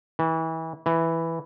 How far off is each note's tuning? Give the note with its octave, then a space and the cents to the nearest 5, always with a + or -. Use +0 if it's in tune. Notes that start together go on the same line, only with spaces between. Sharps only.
E3 -30
E3 +0